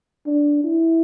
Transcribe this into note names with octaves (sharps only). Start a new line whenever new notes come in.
D4
E4